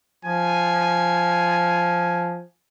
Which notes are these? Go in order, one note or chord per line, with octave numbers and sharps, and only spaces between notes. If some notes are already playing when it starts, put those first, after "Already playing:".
F3 G#5